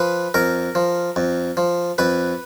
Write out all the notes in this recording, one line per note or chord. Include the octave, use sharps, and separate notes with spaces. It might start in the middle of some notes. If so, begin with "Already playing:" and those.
Already playing: F3 B4
F2 A#4
F3
F2
F3
F2 B4